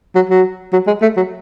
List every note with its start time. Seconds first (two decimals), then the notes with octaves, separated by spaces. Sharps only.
0.15 F#3
0.29 F#3
0.73 F#3
0.87 G#3
1.02 A3
1.17 F#3